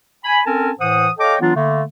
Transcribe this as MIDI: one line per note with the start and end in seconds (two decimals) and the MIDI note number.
0.25 0.40 80
0.25 0.40 83
0.46 0.71 60
0.46 0.71 61
0.46 0.71 69
0.46 0.71 70
0.46 0.71 80
0.46 0.71 81
0.80 1.09 45
0.80 1.09 52
0.80 1.09 72
0.80 1.09 78
0.80 1.09 87
1.19 1.36 69
1.19 1.36 73
1.19 1.36 75
1.19 1.36 77
1.19 1.36 79
1.19 1.36 86
1.40 1.52 52
1.40 1.52 54
1.40 1.52 59
1.40 1.52 62
1.40 1.52 65
1.55 1.83 50
1.55 1.83 57
1.55 1.83 58